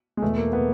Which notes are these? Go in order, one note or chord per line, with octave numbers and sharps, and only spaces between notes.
G#3
E2 B2 A3
A#3
B2 B3